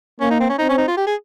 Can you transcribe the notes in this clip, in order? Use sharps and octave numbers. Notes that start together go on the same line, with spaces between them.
A#3 C#4
D#4
C4
C#4
C4 D#4
C#4
D#4
F4
G4
G#4